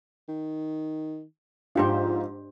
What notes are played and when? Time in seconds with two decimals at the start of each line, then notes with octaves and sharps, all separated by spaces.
0.29 D#3
1.75 G#2 F3 D4 F4 G4 C5